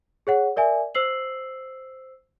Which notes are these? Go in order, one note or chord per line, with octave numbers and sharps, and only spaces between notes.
G#4 C#5 F#5
A#4 D5 E5 G#5
C5 E6 C7 F#7